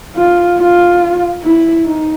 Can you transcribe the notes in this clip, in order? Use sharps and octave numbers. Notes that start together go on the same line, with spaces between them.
F4
F4
E4
D#4